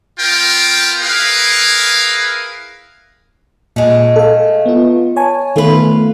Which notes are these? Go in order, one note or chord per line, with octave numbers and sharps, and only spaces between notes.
B3 F4 A#4 G5
E4 G#4 A#4 B4 F5
A#2 G#3 A3
A4 F5
B3 F4
C#5 G#5 A5
D#3 A3 B3 F4 B4